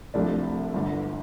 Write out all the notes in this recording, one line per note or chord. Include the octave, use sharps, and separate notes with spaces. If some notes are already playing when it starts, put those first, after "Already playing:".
C2 C3 F3 A3 D4
G1 G2 D3